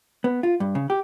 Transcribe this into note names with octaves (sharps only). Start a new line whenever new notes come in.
B3
F4
G2
C#3
G4